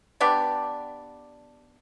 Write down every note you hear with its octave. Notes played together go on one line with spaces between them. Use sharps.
B3 D4 G4 D5